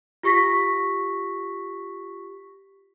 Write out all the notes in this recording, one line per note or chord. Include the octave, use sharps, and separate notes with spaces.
F4 G4 C#6 A#6 B6